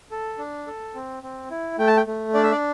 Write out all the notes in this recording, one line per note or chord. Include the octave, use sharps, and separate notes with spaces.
A4
D4
A4
C4
C4
E4
A3 G5
A5
G5
A3
D4 D5
E5
D5